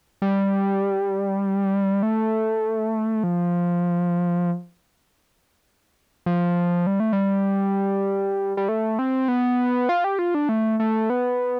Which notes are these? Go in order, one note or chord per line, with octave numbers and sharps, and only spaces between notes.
G3
A3
F3
F3
G3
A3
G3
G3
A3
C4
B3
F4
G4
F4
D4
A3
A3
B3